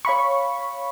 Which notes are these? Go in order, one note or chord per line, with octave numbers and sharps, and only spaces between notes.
C#5 F5 B5 C#6